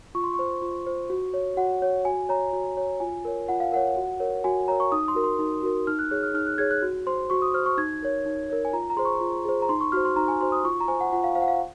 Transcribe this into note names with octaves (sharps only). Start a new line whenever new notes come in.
F4 C#6
C6
C5 C#6
F4
C5
F#4
C#5
F#4 F#5
C#5
F#4 G#5
C#5 A#5
F#4
C#5
F4 G#5
A#4 C#5
F4 F#5
F5
A#4 C#5 F#5
F#4
A#4 C#5
F#4 G#5
A#4 C#5 A#5
C#6
D#4 D#6
C6
F#4 A#4
C6
D#4
F#4 A#4
D#4 F6
F#6
G#4 C#5 F#6
F6
D#4 F6
F#6
G#4 C#5 G#6
F#6
F#4
C5 C6
F#4 C#6
D#6
C5 F6
C#6
D#4 G#6
A#4 C#5
D#4
A#4 C#5
G#5
F4 A#5
A#5
G#4 C5 C6
C#6
F4
G#4 C5
A#5
D#4 C6
C#6
F#4 C5 F6
C6
D#4 A#5
G#5
F#4 C5 C6
D#6
F4 C#6
A#5
C5 G#5
F#5
F4 F#5
F5
C5 F5
F#5
F5